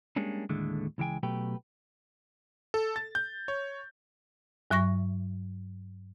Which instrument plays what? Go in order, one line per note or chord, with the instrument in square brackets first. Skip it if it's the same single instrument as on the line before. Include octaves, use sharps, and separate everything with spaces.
[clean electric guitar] G3 G#3 A#3 C#4 D4
D#2 A2 D3 G#3 A3
C#2 E3 G#3 G5 G#5
B2 F#3 A3 G4 B4 G5
[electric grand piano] A4
A6
G6
C#5
[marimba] G2 F#3 E5 C#6 A#6